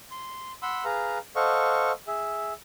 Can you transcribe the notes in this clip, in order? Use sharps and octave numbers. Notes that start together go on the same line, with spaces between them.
C6
F#5 B5 C6 E6
G#4 B4 F5 A#5
A4 C5 D#5 F5 F#5 C#6
G#4 E5